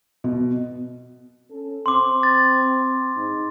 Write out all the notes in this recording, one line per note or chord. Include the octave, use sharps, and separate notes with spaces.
B2
C#4 A4
C4 C6 D6
A6
G#2 D#4